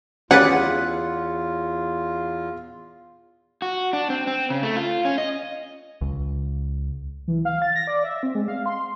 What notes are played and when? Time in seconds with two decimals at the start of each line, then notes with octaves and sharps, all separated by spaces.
0.31 E2 C#4 F4 G4 G#4 B4 D5 F#5
3.62 F#4
3.93 D4
4.10 C4
4.27 C4
4.50 C#3
4.63 A3
4.76 F4
5.05 C#4
5.18 D#5
6.01 C#2
7.28 E3
7.45 F5
7.62 A6
7.76 A#6
7.87 D5
8.04 E5
8.23 C4
8.35 G#3
8.48 F5
8.66 C6